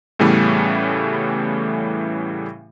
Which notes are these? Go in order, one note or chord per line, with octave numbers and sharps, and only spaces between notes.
A2 C#3 E3 G3 A3 B3